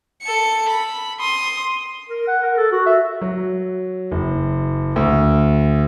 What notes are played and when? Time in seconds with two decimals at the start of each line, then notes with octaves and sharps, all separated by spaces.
0.23 A4 C#7
0.69 B5
1.20 C6 D#6
2.10 A#4
2.28 F#5
2.43 A#4
2.58 A4
2.72 F#4
2.86 E5
3.21 F#3
4.11 F#1
4.96 D2